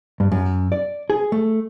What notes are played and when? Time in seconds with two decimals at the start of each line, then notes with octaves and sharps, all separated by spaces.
0.20 G2
0.32 F#2
0.72 D5
1.10 G#4
1.32 A3